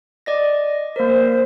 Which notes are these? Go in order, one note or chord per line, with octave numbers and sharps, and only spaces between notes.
D5 D#5 A#6
A#3 A#4 C5